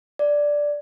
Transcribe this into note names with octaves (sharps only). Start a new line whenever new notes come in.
D5